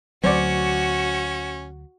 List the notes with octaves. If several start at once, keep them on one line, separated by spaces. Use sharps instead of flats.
D2 F#3 C4 C#4 F#4 D5